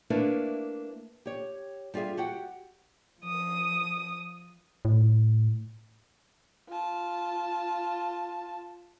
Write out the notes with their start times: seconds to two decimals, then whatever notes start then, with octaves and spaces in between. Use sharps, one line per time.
0.10 A3 A#3 D4 E4 A#4 B4
1.26 G4 C#5
1.94 G3 F4 G4 G#4 E5
2.17 F#4 G4 F#5 G5
3.21 F3 D#6
4.85 A2
6.69 F4 A5